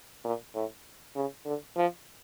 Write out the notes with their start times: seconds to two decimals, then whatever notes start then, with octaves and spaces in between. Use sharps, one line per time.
0.24 A#2
0.55 A2
1.16 C#3
1.46 D3
1.77 F3